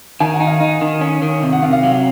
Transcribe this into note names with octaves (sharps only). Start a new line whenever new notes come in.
D#3 G#5
F#5
D#4
F5
D#4
D#3
C#4
D#3
C3
F#5
C3 F5
F5
F#3